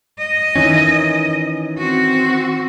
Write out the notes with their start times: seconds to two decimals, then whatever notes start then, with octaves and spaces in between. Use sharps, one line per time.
0.18 D#5
0.56 D#3 E3 C#4
1.78 C4 F#4